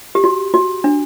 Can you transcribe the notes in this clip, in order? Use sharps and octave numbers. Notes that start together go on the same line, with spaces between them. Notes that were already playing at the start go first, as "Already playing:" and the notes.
G4
F#4
F#4
D4